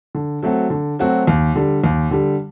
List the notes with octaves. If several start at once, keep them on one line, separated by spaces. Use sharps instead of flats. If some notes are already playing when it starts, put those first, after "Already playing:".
D3
F#3 A3 C4 F#4
D3
F#3 A3 C4 F#4
D#2
D3 G3
D#2
D3 G3